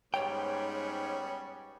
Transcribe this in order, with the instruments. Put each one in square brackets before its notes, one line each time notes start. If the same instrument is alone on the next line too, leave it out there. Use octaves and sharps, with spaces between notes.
[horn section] G#2 [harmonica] G3 B3 C#4 [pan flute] C#5 [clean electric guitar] G5